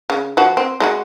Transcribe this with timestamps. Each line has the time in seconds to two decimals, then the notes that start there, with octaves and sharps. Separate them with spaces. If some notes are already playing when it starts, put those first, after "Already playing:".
0.10 C#3
0.37 F3 F#4
0.57 C4
0.80 G#3 E4 F#4